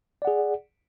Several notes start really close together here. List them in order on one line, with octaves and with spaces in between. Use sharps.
D5 F#5 G#4